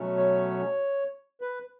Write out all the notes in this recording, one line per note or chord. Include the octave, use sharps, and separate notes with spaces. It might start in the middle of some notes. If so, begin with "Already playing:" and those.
Already playing: B2 F#3 A3 C#4
C#5
B4